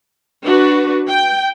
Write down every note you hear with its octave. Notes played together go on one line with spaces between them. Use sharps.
D4 F#4 B4
G5